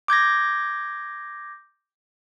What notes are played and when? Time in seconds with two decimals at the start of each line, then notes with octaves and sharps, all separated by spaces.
0.08 D6 G6 G#6 A#6